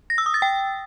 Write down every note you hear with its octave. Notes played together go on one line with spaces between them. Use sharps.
A#6
E6
D#6
A6
G5